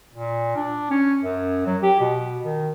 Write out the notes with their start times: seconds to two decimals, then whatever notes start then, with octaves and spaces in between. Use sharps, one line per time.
0.14 A#2
0.56 D4
0.91 C#4
1.23 F#2
1.66 F#3
1.82 G4
2.00 B2
2.45 D#3